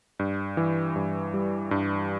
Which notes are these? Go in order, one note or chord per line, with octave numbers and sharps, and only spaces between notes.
G2
E3
G2
G3
G2